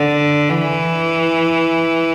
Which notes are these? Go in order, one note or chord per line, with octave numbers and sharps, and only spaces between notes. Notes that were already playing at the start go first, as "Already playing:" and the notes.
Already playing: D3
E3